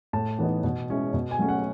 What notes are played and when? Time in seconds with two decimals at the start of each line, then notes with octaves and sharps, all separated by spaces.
0.13 A2 A5
0.39 E3 B3 D#4
0.64 B2
0.89 G#3 C#4 E4
1.14 B2
1.31 G#5
1.39 F#3 A3 C#4
1.49 F#5